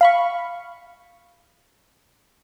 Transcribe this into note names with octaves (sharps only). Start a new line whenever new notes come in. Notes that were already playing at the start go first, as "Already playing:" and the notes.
F5 B5 C#6